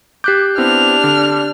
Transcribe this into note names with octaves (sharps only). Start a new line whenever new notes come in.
G4 D6 F#6 G6 B6
B3 C4 D4 E4 F6
D3